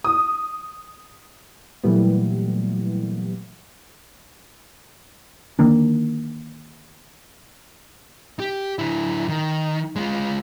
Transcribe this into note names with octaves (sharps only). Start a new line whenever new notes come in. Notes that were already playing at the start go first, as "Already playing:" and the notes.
D#6
A#2 E3 F#3 G3 A3 B3
D3 D#3 A#3 D4
G4
D3 E4
D#3
G#3 F4